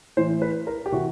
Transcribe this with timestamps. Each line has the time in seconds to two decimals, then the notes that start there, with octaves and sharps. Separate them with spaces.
0.17 A2 E3 C5
0.42 B4
0.67 A#4
0.86 G4
0.92 C3 E3 F#4